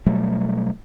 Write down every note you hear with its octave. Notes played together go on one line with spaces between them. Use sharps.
B2 F#3 G3 A3